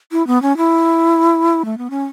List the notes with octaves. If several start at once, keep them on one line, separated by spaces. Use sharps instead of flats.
E4
B3
C#4
E4
A3
B3
C#4